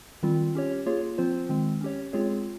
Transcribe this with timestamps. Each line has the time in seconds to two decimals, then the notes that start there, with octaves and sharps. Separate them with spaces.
0.23 D#3 G3 C4 F4
0.55 C#4 G4 C#5
0.86 A#3 F4 G#4 C#5
1.18 F3 C4 F4 C5
1.49 D#3 G#3 C4
1.81 C#4 G4 C#5
2.13 G#3 C4 F4 G#4 C#5